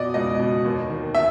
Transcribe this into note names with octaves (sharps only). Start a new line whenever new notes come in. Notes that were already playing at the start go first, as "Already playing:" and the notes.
Already playing: B2 D5 D#5
C#2 D#5
B2
D#2
D#3
E5